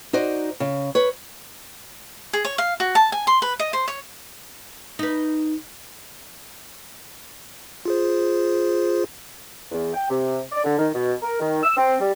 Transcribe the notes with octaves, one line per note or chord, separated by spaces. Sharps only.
D#4 F#4 C5 D5
C#3
B4 C#5
G#4
C#5
F5
F#4
A5
G#5
C6
B4
D#5
C5
C#5
D#4 B4
F4 G#4 C5
E2
G5
C3
D5
D3
D#3
B2
A#4
D#3
E6
C4
G3